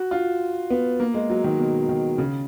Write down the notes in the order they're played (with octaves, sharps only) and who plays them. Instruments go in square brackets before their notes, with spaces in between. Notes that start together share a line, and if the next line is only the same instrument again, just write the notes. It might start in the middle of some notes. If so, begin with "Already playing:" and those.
Already playing: [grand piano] F#4
F4
B3
A#3
G#3
F#3
D#3
B2
D#3
C#3